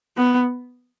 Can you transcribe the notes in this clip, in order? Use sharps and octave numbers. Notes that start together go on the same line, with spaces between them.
B3